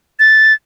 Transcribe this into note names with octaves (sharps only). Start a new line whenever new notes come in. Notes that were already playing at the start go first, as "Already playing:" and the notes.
A6